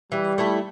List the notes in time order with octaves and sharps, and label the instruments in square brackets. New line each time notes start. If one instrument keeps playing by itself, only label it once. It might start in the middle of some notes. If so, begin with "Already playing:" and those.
[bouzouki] E3 [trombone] G3
[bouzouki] A3 E4 A4